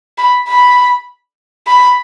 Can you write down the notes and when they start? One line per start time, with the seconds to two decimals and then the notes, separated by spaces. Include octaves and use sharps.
0.18 B5
0.48 B5
1.67 B5